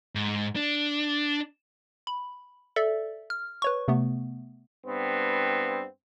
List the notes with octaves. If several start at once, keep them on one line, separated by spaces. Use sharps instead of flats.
G#2
D4
B5
A4 D5 E5
F6
B4 C#5 C#6
C3 A3 B3
G2 B3 C4